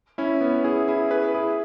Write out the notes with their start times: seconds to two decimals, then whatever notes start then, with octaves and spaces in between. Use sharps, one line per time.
0.18 C#4 E4
0.41 B3
0.64 E4 G#4
0.88 E4 G#4
1.11 G#4 B4
1.34 E4 G#4